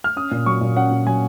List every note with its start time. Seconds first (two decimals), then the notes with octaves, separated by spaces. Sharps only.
0.04 F6
0.16 C#4 D#6
0.31 A#2
0.46 F#3 C#6
0.61 A#2
0.76 C#4 F#5
0.91 A#2
1.07 F#3 G#5